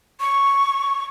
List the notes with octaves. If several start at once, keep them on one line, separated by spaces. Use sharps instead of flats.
C#6